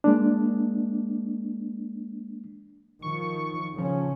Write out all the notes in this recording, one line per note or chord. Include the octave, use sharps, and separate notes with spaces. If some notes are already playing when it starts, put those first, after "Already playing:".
G#3 A#3 D4
D#3 F3 C#6
C#3 F3 C#4